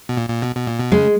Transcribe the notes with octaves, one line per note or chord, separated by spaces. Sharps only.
B2
A#2
A#2
B2
B2
A#2
B2
C#3 G#3